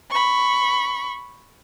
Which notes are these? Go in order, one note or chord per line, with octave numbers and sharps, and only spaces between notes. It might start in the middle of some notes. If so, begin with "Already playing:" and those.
B5 C#6